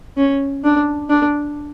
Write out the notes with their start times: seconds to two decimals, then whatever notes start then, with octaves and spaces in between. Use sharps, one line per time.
0.18 C#4
0.64 D4
1.10 D4